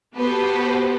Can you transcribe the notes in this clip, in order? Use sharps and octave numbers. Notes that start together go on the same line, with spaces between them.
B3 F#4 G4 A4 B4 C5